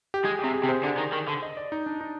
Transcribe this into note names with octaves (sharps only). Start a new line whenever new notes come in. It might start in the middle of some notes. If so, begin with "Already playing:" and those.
G4
G#3 G#4
C3 G4
G#4
C3
C5
D3 D5
D#3
D#3
D3
D#5
D5
D#4
D4
D#4